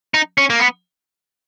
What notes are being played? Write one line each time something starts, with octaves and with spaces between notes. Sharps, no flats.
D#4
C#4
A#3
B3